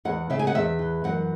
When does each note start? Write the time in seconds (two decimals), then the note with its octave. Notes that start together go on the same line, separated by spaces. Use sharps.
0.05 E2 F#5
0.30 C#3 E5
0.39 G#5
0.47 F#5
0.55 E2 E5
0.79 E3
1.04 F#2 F#5